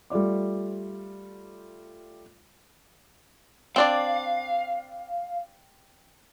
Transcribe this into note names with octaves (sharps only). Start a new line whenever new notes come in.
G3 A3 F4 D5 D6
C4 D4 D5 F5